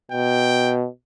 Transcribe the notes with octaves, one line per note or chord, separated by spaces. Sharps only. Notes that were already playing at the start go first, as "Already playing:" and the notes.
B2 G5